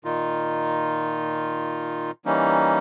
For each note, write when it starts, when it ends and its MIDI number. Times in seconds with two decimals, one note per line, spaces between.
0.04 2.11 46
0.04 2.11 51
0.04 2.11 63
0.04 2.11 65
2.25 2.79 52
2.25 2.79 55
2.25 2.79 58
2.25 2.79 61
2.25 2.79 63